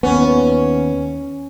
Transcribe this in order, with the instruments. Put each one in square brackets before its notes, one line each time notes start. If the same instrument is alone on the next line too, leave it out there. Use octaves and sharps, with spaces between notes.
[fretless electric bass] D#2 B3 [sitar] C#4